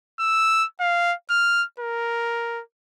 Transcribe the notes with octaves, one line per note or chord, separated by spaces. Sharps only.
E6
F5
F6
A#4